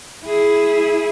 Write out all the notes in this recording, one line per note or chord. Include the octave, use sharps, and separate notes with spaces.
E4 G#4